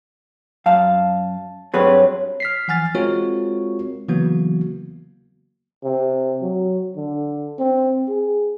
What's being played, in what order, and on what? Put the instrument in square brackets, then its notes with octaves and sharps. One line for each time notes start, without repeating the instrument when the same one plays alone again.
[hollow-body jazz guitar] F#2 F5 [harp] A5
[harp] G2 F#3 [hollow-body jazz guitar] C4 G#4 B4
[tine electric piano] F6 B6 C7
E3 F3 F#5 G#5 F6 A6
G#3 C4 F4 F#4 A#4 C#5
C#3 E3 F#3 A#3 B3 F#4
[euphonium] C3
F#3
D3
C4
G#4